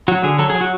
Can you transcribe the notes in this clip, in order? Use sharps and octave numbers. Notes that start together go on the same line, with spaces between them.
F#3 F#4
D3 G#4
F#3 A4
F#3 G#4
F#4